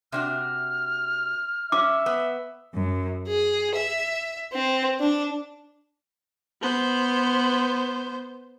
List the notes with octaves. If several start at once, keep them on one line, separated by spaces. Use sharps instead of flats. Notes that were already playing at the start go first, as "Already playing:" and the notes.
C3 D4 F#4 F6
C#4 E5 D6
B3
F#2
G#4
E5
C4
D4
B3 C5